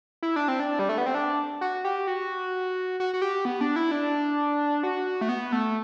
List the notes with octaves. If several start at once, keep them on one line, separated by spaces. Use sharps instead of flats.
E4
D4
C4
D4
G3
A3
B3
C4
D4
F#4
G4
F#4
F#4
F#4
G4
B3
D4
E4
D4
F#4
A3
B3
A3